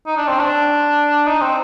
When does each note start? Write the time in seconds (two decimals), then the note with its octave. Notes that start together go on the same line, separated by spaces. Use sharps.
0.07 D#4
0.17 D4
0.28 C4
0.39 D4
1.27 D#4
1.42 C4